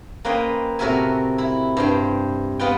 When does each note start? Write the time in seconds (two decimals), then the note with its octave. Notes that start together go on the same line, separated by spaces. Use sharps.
0.25 A#3 C#4 B4 C5 D#5 G5
0.79 A2 C3 F#4 A#4 E5 G#5
1.38 E4
1.77 G2 C5 G5
2.59 B3 F4 B4 D#5 G5